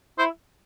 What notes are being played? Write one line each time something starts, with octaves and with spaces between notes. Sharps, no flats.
E4 C5